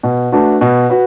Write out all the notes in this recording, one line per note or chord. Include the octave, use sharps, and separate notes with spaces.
B2
A3 D4 F#4 B4
B2
F#4 B4